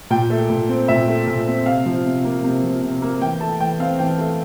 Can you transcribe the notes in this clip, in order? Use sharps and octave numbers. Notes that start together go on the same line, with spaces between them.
A#2 G5
A3
A#2
C4
A#2 E5
A3
A#2
C4
C3 F5
F3
C3
A#3
C3
F3
C3
A#3
E3 G5
A3 A5
E3 G5
C4 F5
E3 G5
A3